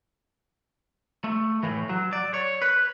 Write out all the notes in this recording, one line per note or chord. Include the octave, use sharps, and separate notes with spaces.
A3
A2 E3
F#3
D5
C#5
B4